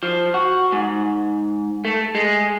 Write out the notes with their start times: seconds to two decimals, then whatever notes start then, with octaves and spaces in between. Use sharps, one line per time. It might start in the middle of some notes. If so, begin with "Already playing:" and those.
0.03 F3
0.34 F#4
0.72 G#2
1.85 A3
2.15 G#3